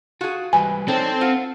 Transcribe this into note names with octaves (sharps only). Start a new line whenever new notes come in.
F4 F#4 G#4
E3 G3 G#3 B4 G#5
C4 D4 D#4 A4 C#5
F4 C5 F#5